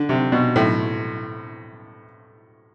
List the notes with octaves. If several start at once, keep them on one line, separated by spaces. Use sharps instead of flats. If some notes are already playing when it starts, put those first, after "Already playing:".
Already playing: D3
C3
B2
A2